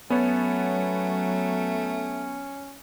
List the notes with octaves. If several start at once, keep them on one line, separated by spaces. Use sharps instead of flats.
F#3 A3 B3 C#4 C#5